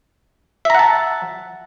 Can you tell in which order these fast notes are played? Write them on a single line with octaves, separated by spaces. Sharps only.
E5 A#5 F#5 A5